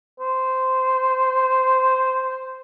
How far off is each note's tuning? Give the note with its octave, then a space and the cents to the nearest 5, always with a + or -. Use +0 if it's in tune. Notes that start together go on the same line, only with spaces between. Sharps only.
C5 -10